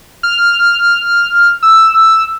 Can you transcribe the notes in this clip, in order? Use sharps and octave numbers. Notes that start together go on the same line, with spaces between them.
F6
E6